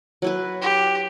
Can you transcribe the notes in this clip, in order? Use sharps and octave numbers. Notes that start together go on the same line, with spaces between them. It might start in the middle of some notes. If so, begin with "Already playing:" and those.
F#3 E4 B4
G4